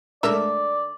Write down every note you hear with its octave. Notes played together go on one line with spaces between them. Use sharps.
A#2 D3 G#3 A3 A#4 D5 E5